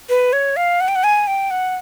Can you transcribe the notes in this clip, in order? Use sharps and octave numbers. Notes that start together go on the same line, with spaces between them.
B4
C#5
F5
F#5
G5
F#5
G#5
G5
F#5